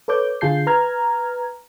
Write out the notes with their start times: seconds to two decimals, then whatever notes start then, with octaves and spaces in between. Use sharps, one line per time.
0.08 A4 B4 C#5 D6 G6
0.41 D3 F4 G#4 A5 G6 C7
0.67 B4 A#5 F6 G#6